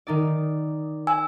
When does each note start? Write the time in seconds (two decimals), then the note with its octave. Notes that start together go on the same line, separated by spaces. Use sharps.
0.07 D#3 D#4 D5
1.07 G#5 E6